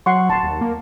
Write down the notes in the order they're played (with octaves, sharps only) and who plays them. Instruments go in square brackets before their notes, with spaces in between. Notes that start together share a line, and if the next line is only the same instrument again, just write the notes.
[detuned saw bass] F#3 [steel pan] F#5 C6 C#6
[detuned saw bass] D#1 [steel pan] A5 C6
[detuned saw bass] D#2
A#3